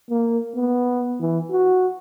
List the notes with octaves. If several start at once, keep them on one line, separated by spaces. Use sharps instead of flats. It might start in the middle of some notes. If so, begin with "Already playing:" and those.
A#3
B3
E3
F#4